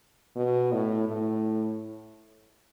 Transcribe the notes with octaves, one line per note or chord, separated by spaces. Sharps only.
B2
A2
A2